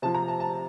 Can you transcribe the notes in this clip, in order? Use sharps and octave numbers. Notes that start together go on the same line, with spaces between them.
C3 F3 A5
A#5
A5
A5